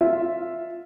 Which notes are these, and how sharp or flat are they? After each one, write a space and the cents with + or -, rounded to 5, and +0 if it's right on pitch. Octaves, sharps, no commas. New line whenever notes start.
F4 +0 E5 +0